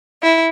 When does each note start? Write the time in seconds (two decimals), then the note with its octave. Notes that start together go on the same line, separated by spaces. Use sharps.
0.22 E4